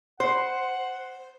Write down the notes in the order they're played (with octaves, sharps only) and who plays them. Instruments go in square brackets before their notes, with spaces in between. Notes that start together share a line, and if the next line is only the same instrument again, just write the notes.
[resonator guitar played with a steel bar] C5 [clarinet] F#5